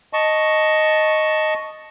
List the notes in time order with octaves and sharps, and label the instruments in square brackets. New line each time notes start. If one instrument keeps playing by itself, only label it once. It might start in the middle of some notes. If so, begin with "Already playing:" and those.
[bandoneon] D#5 A5 C#6